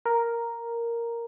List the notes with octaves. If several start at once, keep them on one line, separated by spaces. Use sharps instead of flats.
A#4